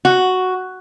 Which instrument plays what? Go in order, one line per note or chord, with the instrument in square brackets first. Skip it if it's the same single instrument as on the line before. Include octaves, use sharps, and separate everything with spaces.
[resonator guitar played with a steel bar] F#4